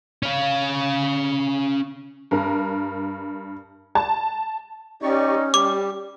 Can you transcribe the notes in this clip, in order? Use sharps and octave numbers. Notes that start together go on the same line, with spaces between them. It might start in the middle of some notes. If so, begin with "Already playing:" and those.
C#4 F5
G2 A#4
A5
C#4 D#4 G4 D5 C#6
G3 G4 D6